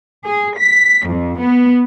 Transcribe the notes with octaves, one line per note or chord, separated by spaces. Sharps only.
G#4
B6
F2
B3